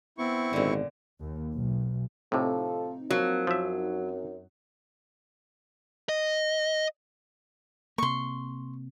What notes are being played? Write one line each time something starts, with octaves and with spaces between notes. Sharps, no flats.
B3 C4 E4 C#6
G#1 A#2 D3
D#2
B1
A2 C3 F3 C4 D#4 F4 A4
F3 F#3 A#3
F#2 F3 E5
D#5
C3 A#3 C6 C#6